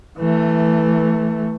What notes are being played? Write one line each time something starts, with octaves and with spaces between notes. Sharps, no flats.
E3 A3